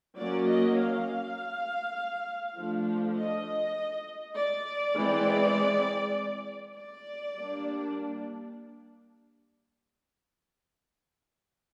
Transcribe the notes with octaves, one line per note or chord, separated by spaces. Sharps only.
F#3 A#3 C#4 D5
D#5
F5
F3 A3 D4
D#5
D5
E3 G#3 C4
D5
G3 A#3 D4